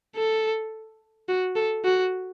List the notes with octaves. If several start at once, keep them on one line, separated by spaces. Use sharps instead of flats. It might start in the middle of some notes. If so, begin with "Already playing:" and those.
A4
F#4
A4
F#4